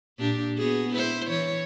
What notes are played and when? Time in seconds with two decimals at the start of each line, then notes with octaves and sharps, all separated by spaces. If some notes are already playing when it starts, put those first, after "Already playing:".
0.19 A#2 D4 G4
0.58 B3 F#4 G#4
0.93 E4 C5
1.28 E3 C#5